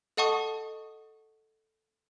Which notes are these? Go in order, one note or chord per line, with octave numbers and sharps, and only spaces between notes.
A4 D#5 F#5 A5 C#6 D#6